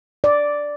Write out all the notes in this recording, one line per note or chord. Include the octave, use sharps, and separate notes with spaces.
D5